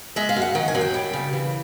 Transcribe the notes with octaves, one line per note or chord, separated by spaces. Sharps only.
G#3 E5
F5
F#2
F#5
D#3
G#5
F#2
G5
G3
C#3
E3